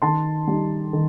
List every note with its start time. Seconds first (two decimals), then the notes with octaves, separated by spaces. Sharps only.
0.02 D#3 A5 C6
0.47 G3 D#4
0.93 D#3